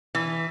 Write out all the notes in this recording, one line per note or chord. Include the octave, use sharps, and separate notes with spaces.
E3